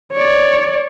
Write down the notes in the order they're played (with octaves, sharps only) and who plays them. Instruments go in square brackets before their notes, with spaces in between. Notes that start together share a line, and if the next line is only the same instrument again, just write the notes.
[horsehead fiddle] C#5 D5